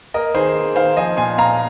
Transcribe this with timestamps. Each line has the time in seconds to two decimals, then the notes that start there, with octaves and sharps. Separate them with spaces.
0.14 A#3 A#4 D#5
0.34 D#3 G#4 C5
0.55 A#3
0.76 D#3 C5 F5
0.97 F3 D#5 G#5
1.17 A#2 G#5 C6
1.38 A#2 F5 A#5